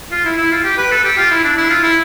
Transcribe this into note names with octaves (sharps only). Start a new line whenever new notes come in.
F4
E4
E4
F4
G4
B4
A4
G4
F4
E4
D4
E4
F4
E4